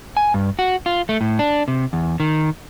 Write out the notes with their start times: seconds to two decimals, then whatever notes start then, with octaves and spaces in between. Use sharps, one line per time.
0.17 G#5
0.34 G2
0.59 F#4
0.86 F4
1.09 A3
1.21 A2
1.39 D4
1.68 C3
1.93 E2
2.20 D#3